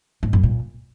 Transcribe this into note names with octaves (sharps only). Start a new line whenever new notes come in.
G#2
F#2
A#2